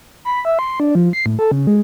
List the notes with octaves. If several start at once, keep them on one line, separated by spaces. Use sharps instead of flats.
B5
E5
C6
D4
F3
C7
A2
A4
C#3
G#3